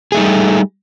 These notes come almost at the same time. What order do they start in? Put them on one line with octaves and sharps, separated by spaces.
G#4 A3 D#4 G3